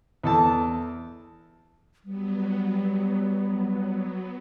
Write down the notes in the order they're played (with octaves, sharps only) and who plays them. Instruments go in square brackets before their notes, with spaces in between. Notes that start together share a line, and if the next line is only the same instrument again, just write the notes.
[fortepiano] E2 A4 A5
[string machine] F#3 B3 [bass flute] G3